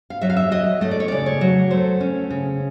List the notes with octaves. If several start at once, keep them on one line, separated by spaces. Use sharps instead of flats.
F5
F#3 E5
F5
E5
F#3 D#5
A3 D#5
D5
C#5
C#3 D5
C#5
F#3
A3 C5
C#4
C#3